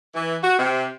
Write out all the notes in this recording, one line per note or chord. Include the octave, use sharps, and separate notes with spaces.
E3
F#4
C3